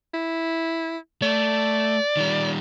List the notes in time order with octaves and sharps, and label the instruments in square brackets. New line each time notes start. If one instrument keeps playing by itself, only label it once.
[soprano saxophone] E4
[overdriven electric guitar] A3 [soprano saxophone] D5
[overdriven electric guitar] D#3 G3